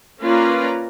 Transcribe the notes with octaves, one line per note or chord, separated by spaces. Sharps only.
A#3 C#4 F4 B4 D5 A#5